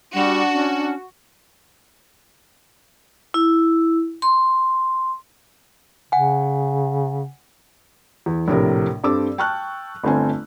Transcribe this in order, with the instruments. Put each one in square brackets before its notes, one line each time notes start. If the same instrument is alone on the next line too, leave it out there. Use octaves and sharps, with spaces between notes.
[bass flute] G3 [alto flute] D4 [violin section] F#4
[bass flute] C#4
[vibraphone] E4
C6
[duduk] C#3 [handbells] F#5 G#5
[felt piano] E2
A#1 A2 C3 A#4
G2 C4 A4 D6 E6
G5 A5 C#6 F6 F#6
G1 A3 C4 C5 G#5